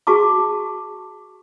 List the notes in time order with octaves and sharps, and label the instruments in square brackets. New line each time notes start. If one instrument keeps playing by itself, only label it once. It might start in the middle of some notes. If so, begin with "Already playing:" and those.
[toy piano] F#4 G#4 A5 C#6 D6